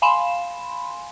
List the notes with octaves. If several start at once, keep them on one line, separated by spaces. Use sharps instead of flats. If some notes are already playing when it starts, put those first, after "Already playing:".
F5 G#5 B5 C6 E7